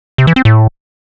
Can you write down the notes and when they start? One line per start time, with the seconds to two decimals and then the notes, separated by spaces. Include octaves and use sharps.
0.18 C3
0.27 E3
0.36 C4
0.45 A2